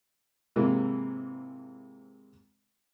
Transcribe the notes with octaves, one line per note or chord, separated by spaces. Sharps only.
G#2 C3 E3 G#3 A#3